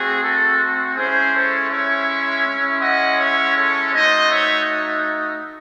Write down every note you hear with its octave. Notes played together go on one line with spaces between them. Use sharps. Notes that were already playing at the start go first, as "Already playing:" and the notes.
Already playing: A3 C4 F#4 G#4
A4
G#3 C#4 E4 G#4 C5
A4 C#5
C#5 E5
G#3 C#4 E4
D#5 F#5
C#5 E5
A4 C#5
A3 D#4 F#4 C5 D#5
C#5 E5